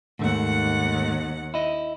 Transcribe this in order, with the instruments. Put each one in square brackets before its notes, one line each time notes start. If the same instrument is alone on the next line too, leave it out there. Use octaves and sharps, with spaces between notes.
[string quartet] D#2 F#5 [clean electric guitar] G#2 A3
[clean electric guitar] E4 D#5